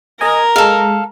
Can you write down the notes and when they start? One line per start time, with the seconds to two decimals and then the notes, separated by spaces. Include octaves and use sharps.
0.21 A#4 D#5 G#5
0.56 G#3 A4 F5